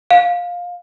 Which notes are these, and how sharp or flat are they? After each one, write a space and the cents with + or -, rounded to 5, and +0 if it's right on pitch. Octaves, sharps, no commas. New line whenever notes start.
F5 +15